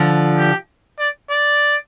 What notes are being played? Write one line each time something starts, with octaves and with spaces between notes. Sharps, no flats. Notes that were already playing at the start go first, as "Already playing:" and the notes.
Already playing: D3 F3
G4
D5
D5